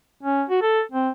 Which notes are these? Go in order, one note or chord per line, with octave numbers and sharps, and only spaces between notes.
C#4
F#4
A4
C4